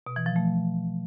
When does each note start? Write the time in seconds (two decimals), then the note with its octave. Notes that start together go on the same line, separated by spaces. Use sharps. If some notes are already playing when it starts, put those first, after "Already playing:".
0.07 B2
0.16 E3
0.26 F3
0.36 A3